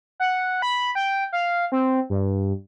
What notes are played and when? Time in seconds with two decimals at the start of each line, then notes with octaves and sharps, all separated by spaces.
0.20 F#5
0.62 B5
0.95 G5
1.33 F5
1.72 C4
2.10 G2